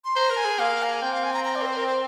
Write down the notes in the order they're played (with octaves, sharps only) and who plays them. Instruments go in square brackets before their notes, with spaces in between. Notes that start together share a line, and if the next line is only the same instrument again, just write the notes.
[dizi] C6
[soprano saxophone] C5 [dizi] A#5
[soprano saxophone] A#4
[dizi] G#5
[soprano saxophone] G#4
[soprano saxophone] A#3 [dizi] F5
[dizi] A#5
G#5
[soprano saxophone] C4 [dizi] G5
[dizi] F5
G#5
A#5
A#5
D5
A#4
C5
A#4
C5